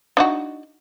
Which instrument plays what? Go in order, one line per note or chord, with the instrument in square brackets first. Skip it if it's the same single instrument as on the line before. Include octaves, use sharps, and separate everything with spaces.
[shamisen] D4 D#4 F#4